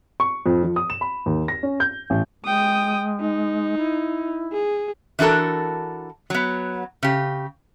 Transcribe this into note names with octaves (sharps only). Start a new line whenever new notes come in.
C#6
F2
F3
D#6
E7
B5
D#2
A#6
C#4
G6
A1
G#3 G5 D#6
D#4
E4
G#4
E3 D4 F#4 A4 A#4
F#3 B3
C#3 G4